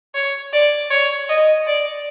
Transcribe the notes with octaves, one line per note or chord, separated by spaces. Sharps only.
C#5
D5
C#5
D#5
D5